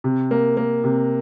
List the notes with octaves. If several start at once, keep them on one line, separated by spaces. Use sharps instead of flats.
C3
A#3
A#3
C3